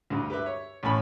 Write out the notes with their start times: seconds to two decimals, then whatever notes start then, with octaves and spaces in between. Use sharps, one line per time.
0.10 D2 G2
0.30 G4 B4 E5
0.46 C#5
0.83 A1 A2 G#5 B5 C#6